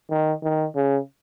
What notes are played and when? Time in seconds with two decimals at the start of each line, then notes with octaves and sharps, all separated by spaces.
0.10 D#3
0.43 D#3
0.76 C#3